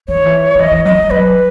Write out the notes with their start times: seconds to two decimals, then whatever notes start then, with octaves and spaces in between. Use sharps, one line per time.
0.08 E3 C#5
0.17 D#3
0.25 E3
0.55 D#3
0.59 E3 D#5
0.72 E3
0.85 F#3 D#5
0.98 F#3
1.11 F#3 B4